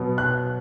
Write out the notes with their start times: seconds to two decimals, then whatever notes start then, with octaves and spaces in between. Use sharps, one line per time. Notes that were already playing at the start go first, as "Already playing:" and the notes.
Already playing: B2 F#3 B3
0.18 F#6